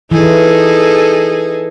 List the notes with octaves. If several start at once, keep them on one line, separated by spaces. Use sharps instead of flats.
E3 D#4 G#4 A4